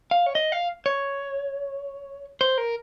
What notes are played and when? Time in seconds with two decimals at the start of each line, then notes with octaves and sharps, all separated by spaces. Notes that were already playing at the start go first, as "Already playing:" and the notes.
0.11 F5
0.26 C#5
0.35 D#5
0.52 F5
0.86 C#5
2.41 C5
2.58 A#4